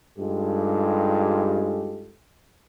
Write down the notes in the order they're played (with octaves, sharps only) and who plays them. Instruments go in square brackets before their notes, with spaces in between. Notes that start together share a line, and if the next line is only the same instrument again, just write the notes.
[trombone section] G2 G#3 D#4 F4 G4 A4